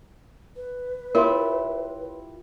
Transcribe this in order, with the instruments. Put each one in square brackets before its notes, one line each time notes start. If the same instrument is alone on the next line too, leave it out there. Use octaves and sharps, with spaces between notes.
[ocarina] B4
[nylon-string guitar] E4 F4 G4 [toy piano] A#4 [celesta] C#5 C6